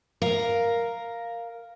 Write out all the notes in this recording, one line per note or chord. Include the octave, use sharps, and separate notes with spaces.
A#4 F5